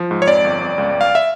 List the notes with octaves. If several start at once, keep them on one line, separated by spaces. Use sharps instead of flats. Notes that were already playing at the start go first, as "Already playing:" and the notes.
Already playing: F3
G#2
C#5
F2 D5
G1
G1
C#2
C#2
F5
E5